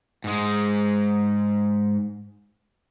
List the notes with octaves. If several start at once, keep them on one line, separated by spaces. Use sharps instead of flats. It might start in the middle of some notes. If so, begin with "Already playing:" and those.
G#2 G#3